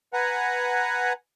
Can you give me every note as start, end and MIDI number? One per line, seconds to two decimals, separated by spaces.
0.13 1.13 71
0.13 1.13 78
0.13 1.13 80
0.13 1.13 82